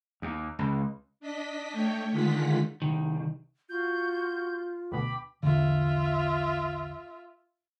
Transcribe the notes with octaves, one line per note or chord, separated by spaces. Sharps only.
D#2
C#2
D4 D#5 B6
A3 C#5 G5
D3 D#3 G#3 F4 F#5 B6
C2 D#3
F4 F#4 G6
D2 B2 G5 B5 D6
A#1 E2 D3 F4 E5